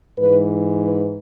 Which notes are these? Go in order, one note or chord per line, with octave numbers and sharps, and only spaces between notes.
G#2 E3 B4
B4